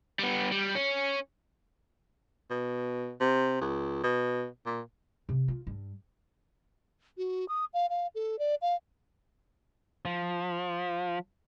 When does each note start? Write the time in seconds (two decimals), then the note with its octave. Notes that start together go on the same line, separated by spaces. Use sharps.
0.19 G3 B3
0.52 G3
0.75 C#4
2.51 B2
3.21 C3
3.61 C#2
4.04 B2
4.66 A#2
5.29 C3
5.48 F4
5.67 G2
7.18 F#4
7.49 D#6
7.74 F5
7.90 F5
8.15 A4
8.39 D5
8.62 F5
10.05 F3